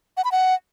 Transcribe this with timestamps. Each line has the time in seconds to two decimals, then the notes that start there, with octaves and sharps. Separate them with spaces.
0.17 F#5
0.24 B5
0.32 F#5